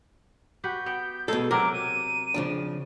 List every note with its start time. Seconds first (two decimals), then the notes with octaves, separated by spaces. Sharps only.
0.64 F#4 G4 B4 G6
0.86 B3 G5
1.28 B2 G#3 A4
1.51 C3 F#3 C4 A#4 D6
1.73 D#7
2.34 C#3 F3 D4